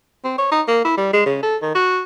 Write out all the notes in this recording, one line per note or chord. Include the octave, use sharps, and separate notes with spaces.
C4
C#5
D#4
A#3
E4
G3
G#3
C#3
A4
D#3
F#4